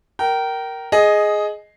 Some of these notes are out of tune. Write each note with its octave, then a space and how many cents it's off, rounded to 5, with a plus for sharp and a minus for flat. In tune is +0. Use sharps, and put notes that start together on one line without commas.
A#4 +0 G5 -25
G#4 +10 D#5 +0